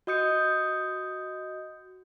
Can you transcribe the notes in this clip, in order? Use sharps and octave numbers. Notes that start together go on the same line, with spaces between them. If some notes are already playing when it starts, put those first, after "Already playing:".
F#4 D#5 D#6 G6 C#7